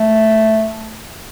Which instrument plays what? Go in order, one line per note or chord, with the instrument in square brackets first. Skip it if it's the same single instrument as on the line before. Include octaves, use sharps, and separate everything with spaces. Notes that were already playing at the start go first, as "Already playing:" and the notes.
Already playing: [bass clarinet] A3